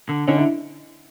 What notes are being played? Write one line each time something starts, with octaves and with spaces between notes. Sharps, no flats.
D3
D3 C#4 D#4
D4 E4